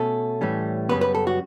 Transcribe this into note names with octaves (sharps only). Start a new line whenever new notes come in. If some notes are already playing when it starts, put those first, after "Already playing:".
Already playing: B2 A3 C#4 A4
A2 E3 G3 C#4
F#2 C#3 G3 B3 B4
B4
A4
F#4